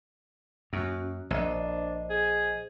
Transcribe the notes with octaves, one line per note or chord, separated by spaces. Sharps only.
F#2 A#3 C#4 F#4
A#1 D4 C5 D#5
G#4